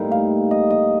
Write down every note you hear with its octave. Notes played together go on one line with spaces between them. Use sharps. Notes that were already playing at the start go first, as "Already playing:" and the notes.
Already playing: A2 G3 A#3 D#4
F5
D#5
D#5